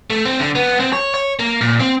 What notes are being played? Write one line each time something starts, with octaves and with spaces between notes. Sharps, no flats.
A3
C4
D3
B3
C4
C#5
C#5
A#3
A#2
C4